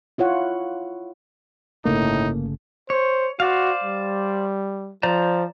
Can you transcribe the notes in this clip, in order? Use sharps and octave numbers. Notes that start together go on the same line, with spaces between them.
E4 F4 C#5 F#5
G1 A2 C#3 A3 A#3 D#4
C5 C#5
F#4 C5 D5 F5
G3
F3 C5 D5 A#5